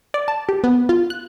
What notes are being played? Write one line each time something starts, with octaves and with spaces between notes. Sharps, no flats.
D5
A5
G4
B3
F4
F#6